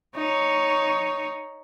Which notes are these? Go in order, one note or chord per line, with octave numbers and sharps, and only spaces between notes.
D#4 C#5